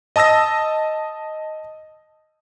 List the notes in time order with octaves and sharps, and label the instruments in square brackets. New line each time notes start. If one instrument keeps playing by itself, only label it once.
[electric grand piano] D#5 A5 D#6 E6 A#6